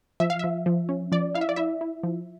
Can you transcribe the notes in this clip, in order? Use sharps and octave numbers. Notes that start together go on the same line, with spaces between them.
F3 E5
F5
F3 E5
F3
C#4
F3 D5
E4 F5
E5
D5
E4 E5
E4
F3